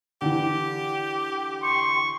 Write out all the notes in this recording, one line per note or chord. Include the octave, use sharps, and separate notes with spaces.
D3 E3 G4
C6 C#6